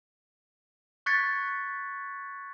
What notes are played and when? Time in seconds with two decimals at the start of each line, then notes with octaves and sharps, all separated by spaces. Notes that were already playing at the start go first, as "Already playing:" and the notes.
1.06 C#6 F#6 G#6 A6 B6 C#7